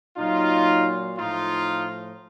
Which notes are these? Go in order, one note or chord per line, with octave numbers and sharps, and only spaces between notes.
A#2 F#3 D#4 F4
A2 F3 D#4 F4